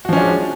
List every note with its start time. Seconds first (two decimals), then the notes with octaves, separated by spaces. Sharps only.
0.05 F#4
0.09 F3
0.13 C#4
0.17 D4
0.21 G#3